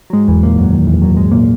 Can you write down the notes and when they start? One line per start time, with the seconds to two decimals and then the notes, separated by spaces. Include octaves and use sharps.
0.10 F#3
0.13 G#2 G#3
0.28 E2 E3
0.43 A#2 A#3
0.58 F#2 F#3
0.73 D#3
0.87 E2 E3
1.02 F#2 F#3
1.17 G#2 G#3
1.32 A#2 A#3